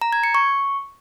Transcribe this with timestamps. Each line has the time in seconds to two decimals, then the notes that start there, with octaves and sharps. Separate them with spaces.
0.01 A#5
0.13 G#6
0.24 C#7
0.35 C#6